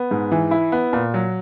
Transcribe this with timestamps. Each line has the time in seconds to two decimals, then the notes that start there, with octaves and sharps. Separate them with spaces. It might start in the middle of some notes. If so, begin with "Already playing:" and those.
Already playing: B3
0.11 G#2
0.32 E3
0.51 E4
0.72 B3
0.93 A#2
1.14 F#3